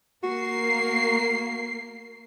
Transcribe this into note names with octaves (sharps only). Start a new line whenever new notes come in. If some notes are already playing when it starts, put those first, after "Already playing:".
A#3 F#4 A#4 C7